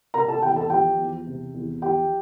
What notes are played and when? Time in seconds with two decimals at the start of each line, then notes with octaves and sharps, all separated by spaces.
0.14 C3 A#4 A#5
0.28 A4 A5
0.42 E2 G4 G5
0.56 A4 A5
0.70 F3 G4 G5
0.98 E2
1.27 C3
1.54 E2
1.82 F3 G4 G5